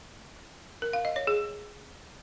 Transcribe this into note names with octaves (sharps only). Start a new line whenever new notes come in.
A#4
F5
D#5
C#5
G#4